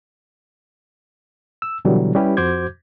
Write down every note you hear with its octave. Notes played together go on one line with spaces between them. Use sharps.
E6
B2 D3 E3 F#3 G3
G3 C#4 E4 G4 B4
F2 F#4 C5 D6 G6 G#6